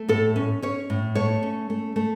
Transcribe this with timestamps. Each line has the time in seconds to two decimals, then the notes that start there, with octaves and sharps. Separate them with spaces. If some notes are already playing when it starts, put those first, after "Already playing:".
Already playing: A3
0.09 A2 A4
0.36 C#4
0.62 C#4 C#5
0.90 A2
1.15 A3 C#5
1.43 C#4
1.70 A3
1.96 A3